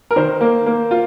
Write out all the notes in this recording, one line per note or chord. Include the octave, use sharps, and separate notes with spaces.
A#4
D#3 C5
A#3
A#3
F4